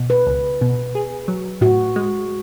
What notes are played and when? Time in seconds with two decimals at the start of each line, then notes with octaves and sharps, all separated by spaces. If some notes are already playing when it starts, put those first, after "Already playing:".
Already playing: B2
0.10 B4
0.27 C#2
0.61 B2
0.95 G#4
1.28 F#3
1.61 A2 F#4
1.96 G#3